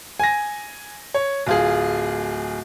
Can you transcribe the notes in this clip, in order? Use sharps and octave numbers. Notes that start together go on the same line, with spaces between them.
G#5 A#6
C#5
D1 F4 G#4